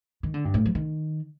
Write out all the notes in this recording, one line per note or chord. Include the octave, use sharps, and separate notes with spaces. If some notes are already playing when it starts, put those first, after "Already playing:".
D#3
D3
G2
A2
F3
D#3